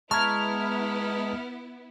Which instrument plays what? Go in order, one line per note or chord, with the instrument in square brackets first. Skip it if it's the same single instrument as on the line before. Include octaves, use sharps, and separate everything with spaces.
[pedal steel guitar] G#3 C#6 [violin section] B3 E4 [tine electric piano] A5 A#5 G#6 [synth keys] F6